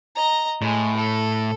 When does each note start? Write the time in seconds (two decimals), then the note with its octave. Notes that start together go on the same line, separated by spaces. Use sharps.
0.16 D#5 A#5
0.62 A2 G#3
0.97 A4